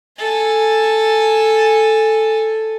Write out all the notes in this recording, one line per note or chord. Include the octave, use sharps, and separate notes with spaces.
A4 G#5